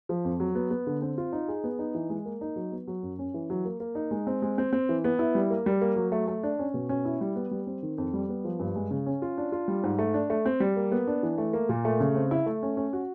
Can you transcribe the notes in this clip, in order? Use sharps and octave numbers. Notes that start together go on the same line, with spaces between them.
F3
F2
F#3
B3
B3
D3
C4
F4
D#4
G#4
B3
D#4
E3
G#3
A#3
D#4
F#3
B3
F#3
F#2
C#4
E3
F#3
A#3
A#3
D#4
G#3
C4
G#3
C4
C4
E3
B3
E4
G3
A#3
G3
A#3
F#3
A3
A3
D4
C#4
B2
C#4
E4
G3
B3
G3
C4
D#3
F2
G3
B3
F3
G2
G#3
C#3
C#4
F4
D4
F4
G3
G#2
A3
D4
A3
C4
G3
A#3
B3
D4
E3
A3
A#3
A#2
A3
C#3
C4
E4
A3
C#4
C#4
F#4